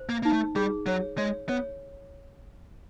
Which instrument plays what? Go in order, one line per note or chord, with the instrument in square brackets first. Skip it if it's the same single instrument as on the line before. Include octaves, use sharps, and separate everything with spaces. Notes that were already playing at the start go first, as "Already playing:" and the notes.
Already playing: [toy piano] C5
[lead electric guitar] A#3
[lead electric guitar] A#3 [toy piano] D#4
[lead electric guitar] A3
[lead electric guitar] G3 [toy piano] G#4
[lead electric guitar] F#3 [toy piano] C#5
[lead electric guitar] G#3 [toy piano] C#5
[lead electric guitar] B3 [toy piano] C#5